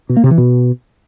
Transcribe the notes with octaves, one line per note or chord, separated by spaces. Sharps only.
B2
A#3
C3
E3
B2